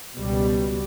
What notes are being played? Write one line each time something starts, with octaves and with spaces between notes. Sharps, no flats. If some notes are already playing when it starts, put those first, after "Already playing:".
C#2 B2 G3